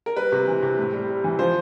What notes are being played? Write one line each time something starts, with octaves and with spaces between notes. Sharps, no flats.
A#4
G3 B4
C3
E3
C3
A2
G3
G3
E3
F3 C5